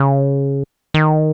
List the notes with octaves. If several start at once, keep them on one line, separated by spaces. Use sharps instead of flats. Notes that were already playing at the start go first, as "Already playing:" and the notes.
Already playing: C#3
D#3